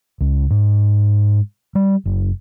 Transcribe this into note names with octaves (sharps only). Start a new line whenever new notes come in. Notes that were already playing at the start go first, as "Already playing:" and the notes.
C#2
G#2
G3
F#1